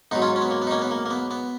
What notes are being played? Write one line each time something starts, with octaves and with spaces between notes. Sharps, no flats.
G#2 F#3 B3 D#4
C#4 F4
C#4
B3
A#3
B3
D#4
A#3 C#4
B3
A#3
A#3
B3
B3